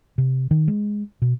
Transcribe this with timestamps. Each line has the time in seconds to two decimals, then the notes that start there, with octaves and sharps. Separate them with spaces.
0.18 C3
0.51 D#3
0.68 G#3
1.22 B2